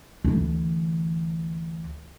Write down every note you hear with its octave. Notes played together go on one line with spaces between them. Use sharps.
D2 E3